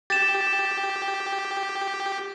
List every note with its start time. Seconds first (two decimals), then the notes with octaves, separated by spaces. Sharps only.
0.10 G4 A6 E7